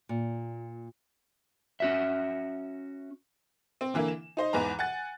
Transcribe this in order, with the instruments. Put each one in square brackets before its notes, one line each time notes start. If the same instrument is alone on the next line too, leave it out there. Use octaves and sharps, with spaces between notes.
[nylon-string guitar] A#2
[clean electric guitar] C#4 F#4 E5
[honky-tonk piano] C4
D3 E3 A#3 E4
E7
D#4 C5 D#5
E2 G#2 E3 B4 A#5
F#5 G#5 F#6 A6